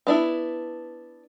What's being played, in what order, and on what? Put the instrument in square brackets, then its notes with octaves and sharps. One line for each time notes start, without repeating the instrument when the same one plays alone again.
[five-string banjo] B3 D4 E4